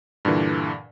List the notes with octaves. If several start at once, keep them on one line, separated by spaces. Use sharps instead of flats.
G2 A#2 D3 E3